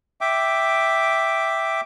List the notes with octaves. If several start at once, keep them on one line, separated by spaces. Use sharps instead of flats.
E5 G5 D6